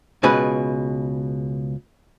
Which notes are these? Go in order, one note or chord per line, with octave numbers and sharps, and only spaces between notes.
C#2 B2 G#4 B4